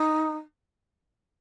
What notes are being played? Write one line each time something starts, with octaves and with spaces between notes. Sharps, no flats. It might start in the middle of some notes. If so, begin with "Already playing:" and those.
Already playing: D#4